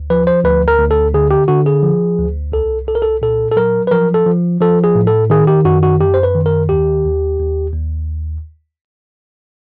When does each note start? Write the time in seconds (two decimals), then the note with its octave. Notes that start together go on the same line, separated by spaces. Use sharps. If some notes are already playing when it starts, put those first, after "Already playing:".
Already playing: D2
0.10 F3 B4
0.27 C5
0.45 D2 B4
0.68 A#4
0.79 D2
0.91 A4
1.14 D3 G#4
1.31 G4
1.48 D3 F#4
1.66 G#4
1.83 F3
2.19 D2
2.52 C2 A4
2.88 C2 A4
2.95 A#4
3.02 A4
3.22 A#2 A4
3.52 A4
3.56 F#3 A#4
3.87 B4
3.91 F3 A#4
4.14 A4
4.26 F3
4.61 F3 A4
4.84 G#4
4.95 A2
5.07 A4
5.30 D#3 G#4
5.47 G4
5.65 F#2 F#4
5.83 F#4
5.99 F#2 G4
6.14 C5
6.23 B4
6.35 D#3
6.46 A#4
6.69 D#2 G4
7.05 D#2
7.40 D#2
7.73 D#2